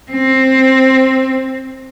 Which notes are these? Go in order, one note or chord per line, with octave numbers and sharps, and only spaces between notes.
C4